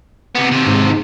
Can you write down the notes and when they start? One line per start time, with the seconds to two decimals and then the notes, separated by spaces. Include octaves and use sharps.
0.35 C3 B3
0.51 D#2 C3
0.66 G#2